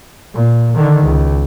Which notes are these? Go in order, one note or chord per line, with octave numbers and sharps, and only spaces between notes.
A#2
D3 D#3
C#2